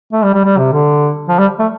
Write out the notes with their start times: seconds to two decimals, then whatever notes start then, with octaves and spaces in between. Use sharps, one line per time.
0.13 A3
0.23 G3
0.34 G3
0.45 G3
0.58 C3
0.72 D3
1.28 F3
1.38 G3
1.59 A3